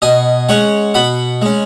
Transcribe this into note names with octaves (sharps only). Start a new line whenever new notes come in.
B2 D#5 G#5
G#3 C#4 C#5 F#5
B2 F#5 B5
G#3 C#4